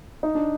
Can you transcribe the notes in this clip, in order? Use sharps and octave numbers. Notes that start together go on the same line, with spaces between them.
D#4
D4